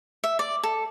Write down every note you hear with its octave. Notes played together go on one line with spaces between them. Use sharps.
E5
D5
A4